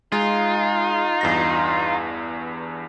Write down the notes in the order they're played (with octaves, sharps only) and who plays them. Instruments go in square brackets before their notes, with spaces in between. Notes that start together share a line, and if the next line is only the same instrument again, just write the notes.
[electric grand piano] G#3 [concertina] D#4 [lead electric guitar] F4
[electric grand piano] E2 G2 A#6